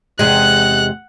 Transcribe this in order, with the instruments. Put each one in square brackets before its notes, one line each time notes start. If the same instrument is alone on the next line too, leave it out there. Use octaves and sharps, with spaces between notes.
[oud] E2 C3 G#3 [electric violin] F#5 F#6